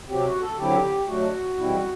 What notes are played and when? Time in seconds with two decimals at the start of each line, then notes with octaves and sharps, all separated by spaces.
0.08 C3 F#3 C4 G4
0.26 F#4
0.41 A4
0.58 D3 F#3 C4 E4 G4
1.07 B2 F#3 A3 D4 F#4
1.58 E2 B2 G3 C4 E4